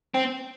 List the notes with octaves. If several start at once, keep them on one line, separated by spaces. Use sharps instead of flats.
C4